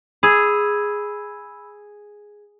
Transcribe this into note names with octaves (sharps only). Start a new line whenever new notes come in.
G#4 B5 E6